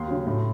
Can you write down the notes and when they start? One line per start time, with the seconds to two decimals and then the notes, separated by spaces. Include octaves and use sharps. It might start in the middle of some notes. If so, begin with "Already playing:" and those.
Already playing: D#2 C6
0.08 C#3 F#3
0.26 A2